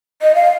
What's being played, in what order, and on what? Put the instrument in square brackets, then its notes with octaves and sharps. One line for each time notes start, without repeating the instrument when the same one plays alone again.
[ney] D#5
F5